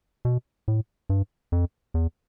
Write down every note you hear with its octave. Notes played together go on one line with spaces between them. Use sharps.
B2
A2
G2
F2
E2